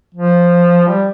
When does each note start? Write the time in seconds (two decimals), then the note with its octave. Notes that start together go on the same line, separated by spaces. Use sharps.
0.14 F3
0.87 G3